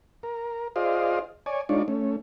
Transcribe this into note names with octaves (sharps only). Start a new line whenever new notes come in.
A#4
F4 G#4 C5 D5 D#5 F5
C#5 D5 G#5
G#3 D4 D#4 F4 C#5 D5
A3 C#4